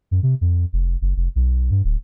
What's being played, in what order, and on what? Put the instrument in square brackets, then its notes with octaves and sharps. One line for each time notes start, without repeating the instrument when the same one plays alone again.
[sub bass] F#2
C3
F2
F1
F#1
F1
B1
G2
D1